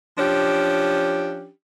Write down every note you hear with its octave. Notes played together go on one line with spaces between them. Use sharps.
F3 C#4 D4 G4